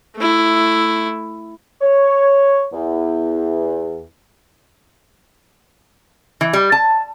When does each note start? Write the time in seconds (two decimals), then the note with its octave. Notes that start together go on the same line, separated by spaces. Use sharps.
0.16 A3 E4
1.81 C#5
2.72 E2
6.41 E3
6.53 G3
6.72 A5